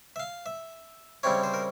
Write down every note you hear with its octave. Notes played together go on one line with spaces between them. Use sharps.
E5
F5
E5
C#3 G3 C4 E4 C#5
C5
A#4